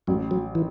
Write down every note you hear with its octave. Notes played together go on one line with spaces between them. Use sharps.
A1 F#3
F#3
E3